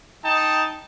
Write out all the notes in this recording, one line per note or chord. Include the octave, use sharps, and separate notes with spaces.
D#4 G5 A5